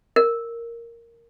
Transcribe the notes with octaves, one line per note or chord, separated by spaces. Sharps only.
A#4